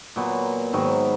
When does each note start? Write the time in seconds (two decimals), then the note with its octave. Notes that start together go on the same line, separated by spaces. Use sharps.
0.16 A#2 F#3 B3
0.73 G#2 D#3 F#3 B3